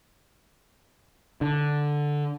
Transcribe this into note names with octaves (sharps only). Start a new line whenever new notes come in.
D3